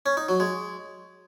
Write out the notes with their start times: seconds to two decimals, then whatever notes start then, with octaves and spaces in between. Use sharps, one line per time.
0.06 C#4
0.17 D#4
0.29 F#3
0.40 G#3